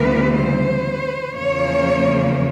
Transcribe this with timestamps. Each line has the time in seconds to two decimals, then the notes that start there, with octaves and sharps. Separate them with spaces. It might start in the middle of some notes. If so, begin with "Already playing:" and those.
Already playing: D2 C#3 E3 G3 B3 B4
0.35 C5
1.34 E2 C#3 F3 A#3 C#5